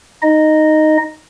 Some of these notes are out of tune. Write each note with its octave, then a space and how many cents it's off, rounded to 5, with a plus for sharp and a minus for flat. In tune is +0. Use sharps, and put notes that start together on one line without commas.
D#4 +0 D#5 -10